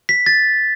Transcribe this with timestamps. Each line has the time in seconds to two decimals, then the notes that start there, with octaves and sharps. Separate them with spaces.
0.09 B6
0.26 A6